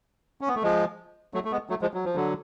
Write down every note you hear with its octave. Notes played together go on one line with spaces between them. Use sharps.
C#4
B3
A3
F3 G#3
F#3 A3
A3
G#3 B3
F#3 A3
F3 G#3
F#3
F3
D3 F#3